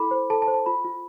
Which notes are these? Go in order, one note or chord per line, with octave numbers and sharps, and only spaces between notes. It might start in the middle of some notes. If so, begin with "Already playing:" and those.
Already playing: E4 A4 B5 D6
C5
A4 A5
A5
C5
A5
F4 B5
F4